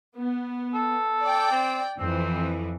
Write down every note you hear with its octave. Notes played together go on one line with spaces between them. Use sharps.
B3
A4
D5 G5
C4
F2 E3 C4